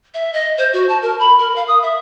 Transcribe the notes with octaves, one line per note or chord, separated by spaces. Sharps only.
E5
D#5
C5
F#4
A5
A#4
B5
A#4
F5
D#6
E5